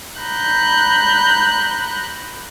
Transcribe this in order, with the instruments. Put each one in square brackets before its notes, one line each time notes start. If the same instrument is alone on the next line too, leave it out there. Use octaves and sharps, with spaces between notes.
[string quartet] A#5 B5 F#6 G6